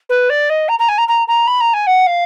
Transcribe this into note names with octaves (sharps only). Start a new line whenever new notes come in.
B4
D5
D#5
A#5
A#5
G#5
A#5
A#5
A#5
B5
A#5
G#5
F#5
F5